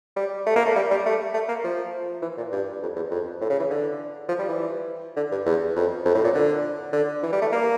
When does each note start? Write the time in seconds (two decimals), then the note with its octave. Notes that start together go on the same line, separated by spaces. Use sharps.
0.16 G3
0.46 A3
0.56 A#3
0.66 A3
0.76 G3
0.91 G3
1.06 A3
1.34 A3
1.49 A#3
1.64 F3
2.22 E3
2.37 A#2
2.52 G2
2.82 F2
2.96 E2
3.11 F2
3.41 A2
3.50 C#3
3.60 E3
3.70 D3
4.28 F3
4.39 G3
4.49 E3
5.17 D3
5.32 G2
5.46 E2
5.76 F2
6.05 F2
6.15 A2
6.24 A#2
6.34 D3
6.93 D3
7.23 E3
7.32 G3
7.41 A3
7.52 A#3